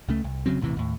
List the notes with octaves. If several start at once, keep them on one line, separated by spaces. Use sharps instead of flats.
C#2 C#3 A3
C2
F1 C#3 F#3 C4
D#1 A1 C3 E3
D#2 A2